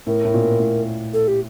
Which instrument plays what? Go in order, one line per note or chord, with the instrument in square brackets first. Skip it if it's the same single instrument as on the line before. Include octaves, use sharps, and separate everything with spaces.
[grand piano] A2 [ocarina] A#4
[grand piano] A2
A#2
A2
[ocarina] A4
G4